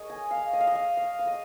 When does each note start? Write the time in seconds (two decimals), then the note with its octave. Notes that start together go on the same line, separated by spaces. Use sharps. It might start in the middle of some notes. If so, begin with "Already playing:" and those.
Already playing: G#4 A#4 C#5 D#5
0.10 G#5
0.31 F5
0.53 D#5
0.61 F5
0.67 D#5
0.75 F5
0.97 F5
1.19 F5
1.27 D#5